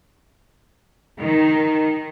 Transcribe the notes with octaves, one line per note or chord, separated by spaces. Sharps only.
D#3